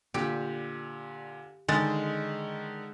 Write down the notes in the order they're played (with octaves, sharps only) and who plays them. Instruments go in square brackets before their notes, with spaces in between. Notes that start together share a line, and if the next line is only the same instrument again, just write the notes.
[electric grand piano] A#2 D3 [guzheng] G4
[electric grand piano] D3 D#3 A6 [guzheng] G#3